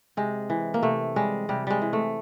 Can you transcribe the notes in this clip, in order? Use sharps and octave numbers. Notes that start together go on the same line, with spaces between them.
C3 G#3
E3
A#3
C3 A3
G3 G#3
C3 G3
G3 G#3
E3
A3